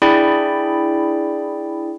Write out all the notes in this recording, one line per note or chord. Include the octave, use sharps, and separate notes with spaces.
D4 E4 G#4 D5 G5 B5